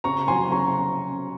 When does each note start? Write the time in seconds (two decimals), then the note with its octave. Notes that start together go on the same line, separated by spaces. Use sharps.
0.04 C#3 A#5 C#6
0.28 F#3 G#5 C6
0.52 C#3 A#5 C#6